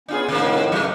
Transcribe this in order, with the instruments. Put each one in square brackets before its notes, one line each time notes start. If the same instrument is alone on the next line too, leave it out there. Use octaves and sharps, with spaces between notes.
[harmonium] B3 C#4 [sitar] D4 F4 G#4
[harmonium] A2 D#3 F3 [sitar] C3 A#3
[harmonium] G2 C#3 [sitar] F#3 A3